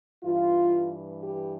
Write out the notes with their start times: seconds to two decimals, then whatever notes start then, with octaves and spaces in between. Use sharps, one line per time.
0.24 G2 E3 F4
1.22 G4